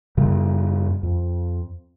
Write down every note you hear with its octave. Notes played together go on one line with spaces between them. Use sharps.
F#2 C#3 G3
F2